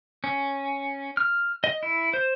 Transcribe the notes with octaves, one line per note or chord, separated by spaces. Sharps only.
C#4
F6
D#5
E4
C5